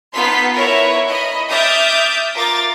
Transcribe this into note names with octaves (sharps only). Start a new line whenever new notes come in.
B3 D#4 F4 A4 C6 B6
E4 A#4 B4 C#5 E5
D#5 B5
E5 D6 D#6 F6 G6 A6
F4 A#4 D6 A6